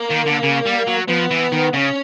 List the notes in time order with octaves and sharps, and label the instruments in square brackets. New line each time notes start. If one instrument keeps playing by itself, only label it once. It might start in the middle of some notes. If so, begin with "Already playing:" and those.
Already playing: [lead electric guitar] A#3
[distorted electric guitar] D#3
D3
C#3
G3
F#3
[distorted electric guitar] F3 [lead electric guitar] B3
[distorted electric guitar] E3
D#3
[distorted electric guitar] C#3 [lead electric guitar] C#4